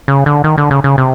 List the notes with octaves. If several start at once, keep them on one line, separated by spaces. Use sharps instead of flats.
C#3
D3
D#3
D3
C#3
C#3
C3